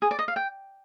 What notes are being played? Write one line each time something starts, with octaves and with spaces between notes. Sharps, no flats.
G#4
D5
D#5
F5
G5